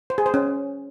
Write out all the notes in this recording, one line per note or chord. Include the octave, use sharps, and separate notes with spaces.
C5
G#4
C5
C#4